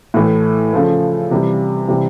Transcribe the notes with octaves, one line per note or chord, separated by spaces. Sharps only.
A2 E3 A3
C#3 F3 A3
C3 E3 G3
C3 E3 G3